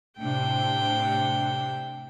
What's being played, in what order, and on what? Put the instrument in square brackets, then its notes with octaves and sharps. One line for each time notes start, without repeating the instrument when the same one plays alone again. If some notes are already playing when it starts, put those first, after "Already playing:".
[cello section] A2 C3 D4 [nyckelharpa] G5